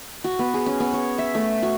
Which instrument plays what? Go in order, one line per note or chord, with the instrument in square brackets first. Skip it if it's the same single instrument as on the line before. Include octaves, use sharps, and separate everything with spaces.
[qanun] F#4
B3
G#4
C#4
B3
C#5
E5
A3
F#4